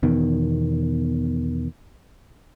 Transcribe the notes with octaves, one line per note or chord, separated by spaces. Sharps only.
E2 B2 D#3